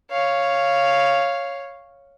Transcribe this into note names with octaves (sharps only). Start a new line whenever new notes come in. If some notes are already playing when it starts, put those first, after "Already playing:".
C#5 F5